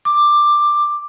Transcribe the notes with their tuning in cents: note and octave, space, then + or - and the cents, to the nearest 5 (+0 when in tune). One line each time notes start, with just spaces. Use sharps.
D6 +10